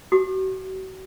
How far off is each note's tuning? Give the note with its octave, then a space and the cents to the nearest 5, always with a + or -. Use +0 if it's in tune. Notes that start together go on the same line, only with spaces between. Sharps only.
F#4 +35 D6 +40